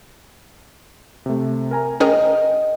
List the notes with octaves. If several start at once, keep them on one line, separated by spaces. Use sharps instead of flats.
C3 A3
A#4 G#5 A#5
C#4 G#4 A#4 D#5 G5